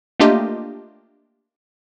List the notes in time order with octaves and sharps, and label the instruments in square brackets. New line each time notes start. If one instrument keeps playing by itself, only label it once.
[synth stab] A3 A#3 D4 F4 G4 D#5